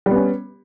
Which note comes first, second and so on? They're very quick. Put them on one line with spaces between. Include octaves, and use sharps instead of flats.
G3 B3 C#4